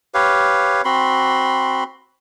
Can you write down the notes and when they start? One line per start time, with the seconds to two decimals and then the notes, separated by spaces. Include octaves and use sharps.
0.14 G4 B4 C#5 F5
0.85 C4 F#4 B5 C6